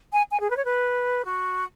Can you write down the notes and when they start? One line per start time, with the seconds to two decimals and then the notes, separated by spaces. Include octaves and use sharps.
0.13 G#5
0.31 G#5
0.40 G#4
0.50 B4
0.57 C#5
0.65 B4
1.25 F#4